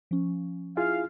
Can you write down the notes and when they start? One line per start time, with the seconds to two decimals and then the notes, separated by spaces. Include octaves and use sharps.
0.11 F3 C#4
0.77 E4 F4 G#4 F5